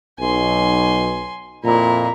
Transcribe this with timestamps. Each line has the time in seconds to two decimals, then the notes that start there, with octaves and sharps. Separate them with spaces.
0.20 B1 G#5 C6
1.64 F2 A#2 E4 A#5